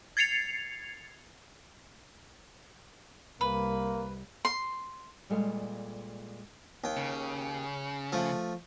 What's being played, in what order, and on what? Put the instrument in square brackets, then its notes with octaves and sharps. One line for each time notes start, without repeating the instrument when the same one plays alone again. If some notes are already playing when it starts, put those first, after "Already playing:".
[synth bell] G#6 A6 C7 C#7 F7
[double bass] C2 [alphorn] A#3 [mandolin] B4
[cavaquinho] C6
[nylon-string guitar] A#2 G3 G#3 A4 B4 F5
[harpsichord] D#2 G5
[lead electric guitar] C#3
[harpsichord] F3 A3